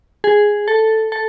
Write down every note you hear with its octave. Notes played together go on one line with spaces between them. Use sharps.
G#4
A4
A4